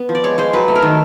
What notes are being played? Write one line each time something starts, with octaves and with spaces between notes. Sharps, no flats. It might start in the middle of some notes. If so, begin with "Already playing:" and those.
Already playing: B3
F3
D5
G#3 C#5
G#3 C5
F#3 B4
A3
A#4
D#3